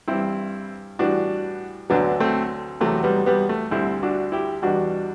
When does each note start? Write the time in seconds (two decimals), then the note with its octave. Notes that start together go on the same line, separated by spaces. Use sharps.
0.08 G2 E3 G3 C4 E4
0.99 A2 E3 G3 D4 F#4
1.90 D2 D3 F#3 B3 D4
2.20 A3 C4
2.81 E2 C3 F#3 A3
3.03 G3 B3
3.26 G3 B3
3.49 A3
3.71 D2 D3 G3 C4 E4
4.03 D4 F#4
4.32 E4 G4
4.62 E2 B2 G3 D4 F#4